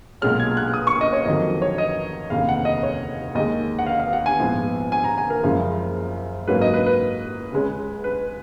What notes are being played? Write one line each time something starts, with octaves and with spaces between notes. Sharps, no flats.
B1 A#2 G#3 C#4 F6
G#6
F#6
D#6
C#6
D#5
C#5
F2 D#3 F#3 D#5
C#5
D#5
F1 D#2 C#3 F5
F#5
D#5
C#5
D#2 D#3 G#3 D#5
F#5
F5
F5
F#5
G#5
A#1 G#2 F3 B3
G#5
A#5
G#5
A#4
F#1 F#2 C#3 F3 G#3
G#2 F#3 A#3 C#4 B4
D#5
B4
B4
C#2 C#3 G#3 C#4
B4